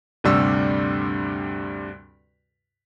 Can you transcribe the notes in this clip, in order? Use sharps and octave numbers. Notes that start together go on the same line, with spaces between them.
D2 G2 C3 G3 E6